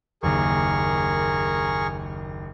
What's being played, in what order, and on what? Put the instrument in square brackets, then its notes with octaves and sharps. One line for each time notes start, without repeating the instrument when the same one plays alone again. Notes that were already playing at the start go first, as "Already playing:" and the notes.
[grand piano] F#1 D#2 [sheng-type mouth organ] G#4 A#4 C#6